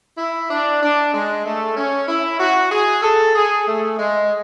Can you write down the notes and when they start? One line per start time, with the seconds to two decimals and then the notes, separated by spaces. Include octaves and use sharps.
0.18 E4
0.50 D4
0.82 D4
1.13 G#3
1.45 A3
1.77 C#4
2.08 E4
2.39 F#4
2.71 G#4
3.03 A4
3.35 G#4
3.67 A3
3.98 G#3